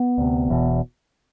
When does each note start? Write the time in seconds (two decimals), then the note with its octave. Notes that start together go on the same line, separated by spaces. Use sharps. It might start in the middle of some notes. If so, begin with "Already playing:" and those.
Already playing: B3
0.18 D2 C3
0.49 E1 E2 B2